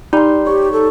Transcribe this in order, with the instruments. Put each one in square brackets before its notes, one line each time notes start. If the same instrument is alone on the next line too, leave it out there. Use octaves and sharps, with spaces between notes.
[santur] G3 C6 [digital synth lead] D#4
[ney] G4 [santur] C#5
[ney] A4